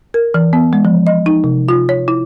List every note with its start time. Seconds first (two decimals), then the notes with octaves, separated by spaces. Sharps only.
0.14 A#4
0.34 E3
0.53 B3
0.73 G#3
0.85 F3
1.07 D#5
1.26 D#4
1.44 C3
1.69 F4
1.89 C#5
2.08 E4